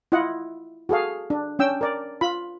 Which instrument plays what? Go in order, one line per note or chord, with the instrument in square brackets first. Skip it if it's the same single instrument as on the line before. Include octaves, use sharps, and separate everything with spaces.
[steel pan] E4 F4 D#5 F#5
F#4 G#4 A4 F5
D4
C#4 D4 G5 E6
A#4 D5
F4 B5